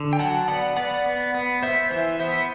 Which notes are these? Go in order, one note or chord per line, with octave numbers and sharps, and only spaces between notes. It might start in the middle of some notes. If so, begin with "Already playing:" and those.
Already playing: D3
G5
F#3 F#5 A5
B3 D5 F#5
B3 D5 F#5
B3
B3
B3 C5 E5
E3 C5 E5
B3 C5 E5